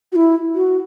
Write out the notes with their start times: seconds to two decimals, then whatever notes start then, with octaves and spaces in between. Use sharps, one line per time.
0.12 F#4
0.16 E4
0.55 F#4